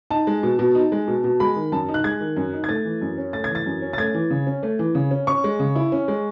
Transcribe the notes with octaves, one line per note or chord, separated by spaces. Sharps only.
D#4 A5
G#3
B2
B2
D#4
G#3
B2
B2
G#3 B5
D#3
F#2 A5
D#4
F#6
G#3 G#6
D#3
F#2
D#4
G#6
A3 A6
E3
F#2
C#4
A3 A6
G#6
E3
A6
F#2
C#4
A6
A3 G#6
E3
C#3
C#4
A3
E3
C#3
C#4
C#4 C#6
G#3
C#3
E4
C#4
G#3